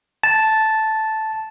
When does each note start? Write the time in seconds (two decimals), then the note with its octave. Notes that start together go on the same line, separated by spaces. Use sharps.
0.23 A5